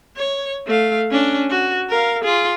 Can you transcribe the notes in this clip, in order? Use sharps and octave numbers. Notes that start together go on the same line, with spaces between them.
C#5
A3 F5
C#4 D4
F#4
A#4 F5
F4 G#4